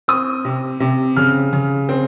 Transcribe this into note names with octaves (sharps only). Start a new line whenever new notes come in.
C4 D#6
C3
C3
C#3 F6
C#3
C4